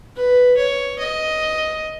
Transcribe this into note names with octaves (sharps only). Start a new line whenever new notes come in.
B4
C#5
D#5